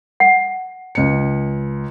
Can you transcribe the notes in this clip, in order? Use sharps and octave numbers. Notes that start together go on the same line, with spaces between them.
F#5
C#2 C#7